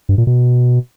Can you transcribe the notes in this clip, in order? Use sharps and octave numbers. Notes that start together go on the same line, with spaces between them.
G2
A#2
B2